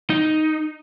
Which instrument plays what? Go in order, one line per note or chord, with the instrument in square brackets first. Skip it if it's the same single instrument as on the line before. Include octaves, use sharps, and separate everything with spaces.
[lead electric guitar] D#4